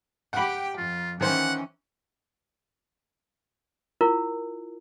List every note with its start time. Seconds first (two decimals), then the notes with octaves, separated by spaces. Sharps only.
0.33 G4 F#5 G5 B5
0.77 F2 F4
1.21 D#3 E3 C#4 C5 F#5
4.01 E4 F4 A#4